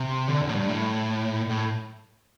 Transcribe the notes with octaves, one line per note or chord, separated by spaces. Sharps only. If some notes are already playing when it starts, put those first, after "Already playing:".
Already playing: C3
D3
E2
A2
G2
A2
A2